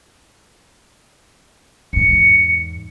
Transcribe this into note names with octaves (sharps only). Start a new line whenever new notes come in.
E2 G#2 C#7